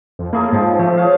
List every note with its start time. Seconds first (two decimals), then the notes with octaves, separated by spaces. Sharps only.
0.19 F2
0.33 A#3 E4 G#4 A4
0.53 G#2 F3 C4
0.79 F3 A3
0.97 G#4 C#5 F5